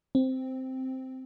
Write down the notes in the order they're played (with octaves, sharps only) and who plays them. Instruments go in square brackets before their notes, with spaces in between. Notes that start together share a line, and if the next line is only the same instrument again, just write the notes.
[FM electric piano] C4